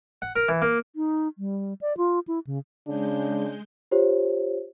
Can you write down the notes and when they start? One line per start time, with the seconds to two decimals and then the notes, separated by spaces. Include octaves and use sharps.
0.22 F#5
0.36 A#4
0.49 E3
0.62 A#3
0.96 D#4
1.38 G3
1.81 D5
1.97 F4
2.28 E4
2.47 C#3
2.87 C#3 G#3 D4 G6
3.91 F4 G4 C5 C#5